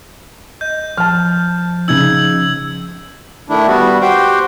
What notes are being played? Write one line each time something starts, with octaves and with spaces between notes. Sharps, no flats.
D#5 G6
F3 A5 F6
C#3 D#4 E6 G#6 F#7
D#3 A3 D4 E4
G3 B3 F#4
F#4 G4 C5 G5